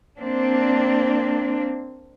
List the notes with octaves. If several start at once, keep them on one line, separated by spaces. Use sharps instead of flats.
A#3 C4 D4